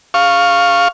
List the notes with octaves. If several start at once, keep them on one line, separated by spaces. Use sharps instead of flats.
F5 C#6